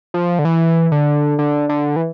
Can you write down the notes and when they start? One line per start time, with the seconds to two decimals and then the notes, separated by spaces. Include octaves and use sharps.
0.14 F3
0.39 D3
0.45 E3
0.92 D3
1.39 D3
1.69 D3
1.96 E3